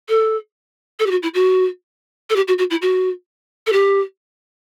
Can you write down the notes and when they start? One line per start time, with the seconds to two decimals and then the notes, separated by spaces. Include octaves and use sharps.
0.09 A4
0.99 A4
1.06 G4
1.11 F#4
1.22 E4
1.34 F#4
2.30 A4
2.36 G4
2.48 F#4
2.58 F#4
2.70 E4
2.82 F#4
3.67 A4
3.72 G4